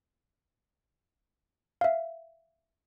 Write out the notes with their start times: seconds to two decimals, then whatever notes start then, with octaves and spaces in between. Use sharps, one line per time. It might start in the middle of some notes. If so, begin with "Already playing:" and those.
1.81 E5 F5